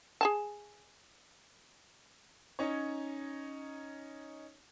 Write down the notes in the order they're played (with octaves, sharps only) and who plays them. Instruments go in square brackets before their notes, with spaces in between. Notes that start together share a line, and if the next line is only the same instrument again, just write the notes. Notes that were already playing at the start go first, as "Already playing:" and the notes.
[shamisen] G#4 G#5 A5
[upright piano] C#4 D#4 C#5